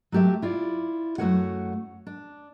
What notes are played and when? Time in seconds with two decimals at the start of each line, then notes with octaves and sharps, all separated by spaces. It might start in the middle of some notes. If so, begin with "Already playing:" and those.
0.12 F#3 A3 G4 A4 E5
0.42 E4 F4 D5
1.18 F#2 A3 F#4 B4 C#5 F#5
2.07 D4